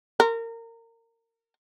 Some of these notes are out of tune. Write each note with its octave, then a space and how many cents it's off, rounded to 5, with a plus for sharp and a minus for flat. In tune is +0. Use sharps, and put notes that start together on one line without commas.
A#4 -25